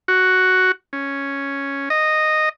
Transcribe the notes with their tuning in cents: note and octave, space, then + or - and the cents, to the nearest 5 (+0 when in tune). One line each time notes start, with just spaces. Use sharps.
F#4 +5
C#4 +0
D#5 -10